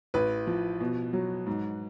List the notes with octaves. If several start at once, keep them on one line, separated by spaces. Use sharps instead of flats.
A1 B4
F3
B2
F#3
G#2